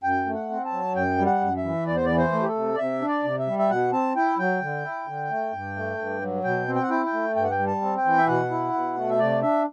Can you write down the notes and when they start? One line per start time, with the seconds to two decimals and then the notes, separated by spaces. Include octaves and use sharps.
0.03 F#2 G5
0.26 A3
0.34 F#5
0.50 C4
0.65 A5
0.72 F#3
0.95 F#2 G5
1.18 G3
1.26 F#5
1.41 F#2
1.57 E5
1.64 E3
1.87 E2 D5
1.96 C5
2.05 E3 D5
2.18 C5
2.32 A3
2.42 G4
2.48 A4
2.55 C3
2.74 D5
2.78 C3 E5
3.02 D4
3.08 D5
3.24 C3
3.39 E5
3.47 G3
3.59 E5
3.70 B2 F#5
3.92 C4 A5
4.16 E4 G5
4.38 F#3 G5
4.62 D3
4.85 E4
5.07 D3
5.30 A3
5.52 G2
5.76 A3
5.98 G2
6.21 F#3
6.44 B2 G5
6.68 C4
6.75 G5
6.82 F#5
6.90 E4 G5
7.06 G5
7.13 A3
7.36 G2 G5
7.44 F#5
7.51 G5
7.59 G3
7.67 A5
7.82 C4
7.97 G5
8.05 E3
8.18 E5
8.27 B2 F#5
8.51 E4
8.73 B2
8.96 A3
9.10 E5
9.19 C3 D5
9.42 D4 E5